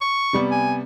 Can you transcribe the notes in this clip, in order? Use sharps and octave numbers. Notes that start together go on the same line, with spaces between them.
C#6
C3 G3 B3
G#5